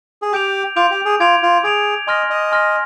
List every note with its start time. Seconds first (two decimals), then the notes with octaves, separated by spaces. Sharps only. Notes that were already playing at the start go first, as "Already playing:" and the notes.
0.22 G#4
0.32 G4 D6 G6 D7 F7
0.76 F4 D6 G6 D7 F7
0.91 G4
1.05 G#4
1.20 F4 D6 G#6 D7 F7
1.43 F4
1.63 G#4 D6 G#6 D7 F7
2.07 D#5 G#5 C6 F6 A#6
2.30 D#5
2.52 G#5 C6 F6 A#6